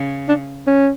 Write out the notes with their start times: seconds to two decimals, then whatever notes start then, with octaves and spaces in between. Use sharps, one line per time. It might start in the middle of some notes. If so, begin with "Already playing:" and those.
Already playing: C#3
0.28 D4
0.67 C#4